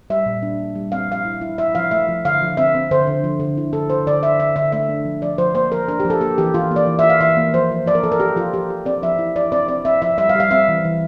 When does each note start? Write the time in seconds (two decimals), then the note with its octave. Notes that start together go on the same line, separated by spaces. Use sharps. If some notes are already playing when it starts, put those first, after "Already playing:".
0.10 G3 E5
0.26 A#2
0.43 D4
0.59 G3
0.75 G3
0.92 C4 F5
1.08 F3 F5
1.25 E4
1.41 E4
1.58 E4 E5
1.75 F3 F5
1.91 A3 E5
2.08 F3
2.25 D3 F5
2.42 F3
2.57 C4 E5
2.75 C4
2.91 D3 C5
3.07 D3
3.24 F3
3.40 D3
3.58 E4
3.73 D3 A4
3.90 D3 C5
4.07 D3 D5
4.22 D3 E5
4.40 D3 E5
4.56 D3 E5
4.72 A3 E5
4.89 D4
5.05 F3
5.22 F3 D5
5.38 F3 C5
5.55 A#3 C5
5.72 F3 A#4
5.88 D4 A#4
6.00 G4
6.05 F3
6.10 A4
6.21 A#3 G4
6.38 E3 G4
6.54 E3 F4
6.71 A#3
6.76 D5
6.87 E3
6.99 E5
7.04 F4
7.10 F5
7.20 E3 E5
7.37 A#3
7.54 F3 C5
7.71 F3
7.86 F3 D5
7.95 A#4
8.03 F3 A4
8.12 A#4
8.20 F4 G4
8.36 F3 F4
8.53 F3 G4
8.70 F4
8.85 C4 D5
9.02 F3 E5
9.19 E4
9.36 E4 D5
9.52 C4 D5
9.68 C4 D5
9.85 C4 E5
10.02 F3 E5
10.18 G3 E5
10.29 F5
10.35 G3
10.40 F5
10.51 C4 E5
10.69 E3
10.85 E3